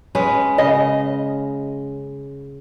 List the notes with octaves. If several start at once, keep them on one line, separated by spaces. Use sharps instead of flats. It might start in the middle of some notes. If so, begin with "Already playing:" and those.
G#3 C#4 B4
C#3 D#5